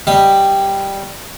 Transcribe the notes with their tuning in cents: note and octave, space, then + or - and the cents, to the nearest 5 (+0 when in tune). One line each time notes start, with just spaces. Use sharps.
G3 +0 D#5 +0